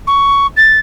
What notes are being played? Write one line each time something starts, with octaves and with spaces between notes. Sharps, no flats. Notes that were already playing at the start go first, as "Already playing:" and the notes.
C#6
A6